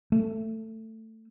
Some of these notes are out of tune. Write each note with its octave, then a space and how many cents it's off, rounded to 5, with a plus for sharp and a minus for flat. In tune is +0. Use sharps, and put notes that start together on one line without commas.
A3 +15